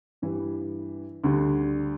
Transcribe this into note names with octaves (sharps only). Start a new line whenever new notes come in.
G2 E3 G3
D2 D3 G3